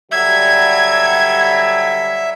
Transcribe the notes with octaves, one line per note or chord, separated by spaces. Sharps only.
D3 F#3 G3 E5 G#6